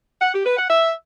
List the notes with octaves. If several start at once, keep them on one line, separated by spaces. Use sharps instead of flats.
F#5
G4
B4
F#5
E5